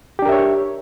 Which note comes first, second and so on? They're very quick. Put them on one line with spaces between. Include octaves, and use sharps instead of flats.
G4 D4 A#4 E5 C#5